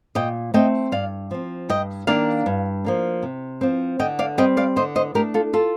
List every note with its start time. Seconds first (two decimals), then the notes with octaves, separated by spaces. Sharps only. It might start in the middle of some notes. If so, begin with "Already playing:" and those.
0.15 A#2 D#5 G5
0.54 A3 C4 D#5 G5
0.92 G2 D5 F5
1.31 F3 C4
1.69 G2 D#5 G5
2.07 D#3 A#3 D4 D5 F5
2.46 G2
2.85 F3 A#3 D4
3.22 C3
3.61 F3 C4
3.99 D3 D#5 G5
4.19 D5 F5
4.38 G3 C4 D#5 G5
4.57 D5 F5
4.76 D3 C5 D#5
4.95 C5 D#5
5.14 A3 D4 G4 A#4
5.34 F4 A4
5.53 F4 A4